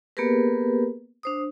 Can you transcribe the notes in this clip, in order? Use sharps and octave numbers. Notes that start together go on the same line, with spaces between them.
A#3 B3 G4 G#4 A#4 B4
D4 C5 D#6